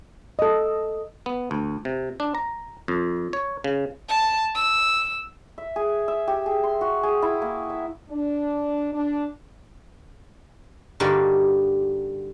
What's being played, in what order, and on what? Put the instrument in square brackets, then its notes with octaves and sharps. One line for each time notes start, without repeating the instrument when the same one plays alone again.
[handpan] A4 D#5
[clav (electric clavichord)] B3
D2
C3
D4
A#5
F2
C#5
C#3
[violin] A5
E6
[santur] E5
G#4
E5
G4
G#4
C6
F#4
G#4
E4
A#3
E5
[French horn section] D4
D4
[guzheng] G2 D3 G3 A#3 D#4 F#4